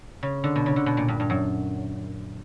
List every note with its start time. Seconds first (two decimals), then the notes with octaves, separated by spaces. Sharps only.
0.23 C#3
0.44 D3
0.56 B2
0.66 C#3
0.76 D3
0.86 B2
0.97 A#2
1.08 G2
1.20 G2
1.30 F#2